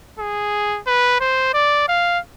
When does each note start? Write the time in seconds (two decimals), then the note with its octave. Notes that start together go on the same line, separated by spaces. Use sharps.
0.20 G#4
0.87 B4
1.21 C5
1.54 D5
1.89 F5